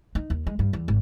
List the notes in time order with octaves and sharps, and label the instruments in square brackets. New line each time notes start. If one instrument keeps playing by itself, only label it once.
[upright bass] D#4
D#2
G#3
G2
E2
G#1